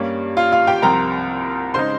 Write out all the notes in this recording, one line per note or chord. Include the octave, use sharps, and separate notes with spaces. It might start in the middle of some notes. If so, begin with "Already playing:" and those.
Already playing: G2 G3 A#3 C#4
F4 F5
F4 F5
G4 G5
C2 C3 F3 C4 A#4 A#5
C#3 G#3 D#4 C5 C6